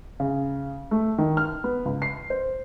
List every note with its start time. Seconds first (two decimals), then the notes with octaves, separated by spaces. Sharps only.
0.20 C#3
0.91 A3
1.18 D#3
1.37 F6
1.64 B3
1.85 C#2
2.02 C7
2.30 C5